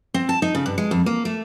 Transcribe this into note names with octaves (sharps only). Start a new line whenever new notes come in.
C4
A5
D#4
C#3
G2
G#3
F2
A#3
A3